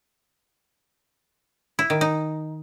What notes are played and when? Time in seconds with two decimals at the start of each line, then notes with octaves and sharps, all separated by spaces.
1.79 E4
1.90 D#3
2.01 D#4